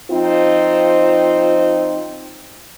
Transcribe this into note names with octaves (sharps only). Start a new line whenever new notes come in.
F3 C4 D#4 F4 C5